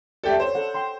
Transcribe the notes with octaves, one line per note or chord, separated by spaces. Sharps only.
A3 G4 A4 D5
A4 C5 C#5
A4 F#5
G5 C6